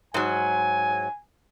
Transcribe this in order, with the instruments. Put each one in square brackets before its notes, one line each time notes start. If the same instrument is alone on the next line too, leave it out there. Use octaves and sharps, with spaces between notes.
[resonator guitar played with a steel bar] G#2 F#3 [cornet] G#5